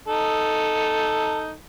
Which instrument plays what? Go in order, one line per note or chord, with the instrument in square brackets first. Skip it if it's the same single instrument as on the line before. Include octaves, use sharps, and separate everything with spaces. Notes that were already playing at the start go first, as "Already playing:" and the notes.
[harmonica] D#4 A4